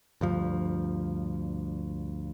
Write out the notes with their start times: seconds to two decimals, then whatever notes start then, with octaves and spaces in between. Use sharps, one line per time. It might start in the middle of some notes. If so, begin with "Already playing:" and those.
0.21 D2 G2 F3